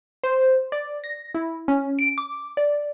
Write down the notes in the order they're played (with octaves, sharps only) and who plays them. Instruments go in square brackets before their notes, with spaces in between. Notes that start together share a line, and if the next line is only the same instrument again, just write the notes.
[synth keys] C5
D5
A#6
E4
C#4
D7
D6
D5